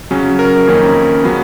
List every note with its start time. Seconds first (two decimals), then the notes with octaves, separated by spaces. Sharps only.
0.11 C#3 F#3 C#4
0.39 A#4
0.67 F2 D#3 A#3 C#4
1.24 C#3 F#3 B3